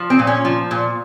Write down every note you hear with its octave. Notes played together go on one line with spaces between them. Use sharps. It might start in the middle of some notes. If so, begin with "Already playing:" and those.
Already playing: F3
C4
A#2
C#4
F3
A#2